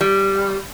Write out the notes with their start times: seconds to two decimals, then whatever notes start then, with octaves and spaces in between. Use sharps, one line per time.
0.01 G3